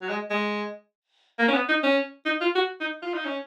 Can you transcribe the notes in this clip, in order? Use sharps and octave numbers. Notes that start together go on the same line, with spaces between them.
F#3
G#3
G#3
A#3
C#4
B3
D#4
C#4
D#4
F4
F#4
D#4
F4
D#4
C#4